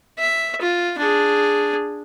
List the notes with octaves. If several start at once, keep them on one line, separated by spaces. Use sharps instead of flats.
E5
F4
D4 G#4